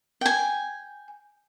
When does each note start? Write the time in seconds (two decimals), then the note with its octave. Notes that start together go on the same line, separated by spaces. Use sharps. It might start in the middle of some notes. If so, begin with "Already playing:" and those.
0.21 G5 G#5